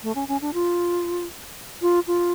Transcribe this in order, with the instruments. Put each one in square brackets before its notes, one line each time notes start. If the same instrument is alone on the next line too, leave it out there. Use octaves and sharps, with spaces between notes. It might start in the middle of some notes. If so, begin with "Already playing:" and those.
[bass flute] A3
C#4
C#4
D4
F4
F4
F4